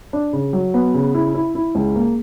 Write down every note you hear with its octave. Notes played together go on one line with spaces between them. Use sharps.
D4
C#3
F#3
B3
C#3
E4
E4
E4
C#2
A#3